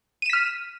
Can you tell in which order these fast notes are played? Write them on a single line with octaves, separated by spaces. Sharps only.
D#7 E7 B6 F6